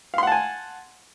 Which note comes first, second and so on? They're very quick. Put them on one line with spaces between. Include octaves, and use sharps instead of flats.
F5 C6 F#5 A5 G#5